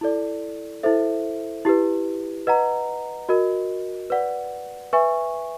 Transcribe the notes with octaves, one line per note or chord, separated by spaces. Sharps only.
E4 A4 D5
E4 A4 C5 E5
E4 G4 B4
B4 D#5 F#5 A#5
F#4 A#4 D#5
B4 D5 F#5
B4 E5 G#5 C#6